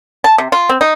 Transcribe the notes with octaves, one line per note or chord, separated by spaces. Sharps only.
A5
C3
F4
C4
D#4